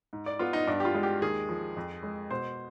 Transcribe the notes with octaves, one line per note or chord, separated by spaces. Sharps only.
G#2
D5
B3 F4
D#4
G2 D4
G4
F4
G#3
G4
D#2 G#4
F3
F2
G#3
B2 C5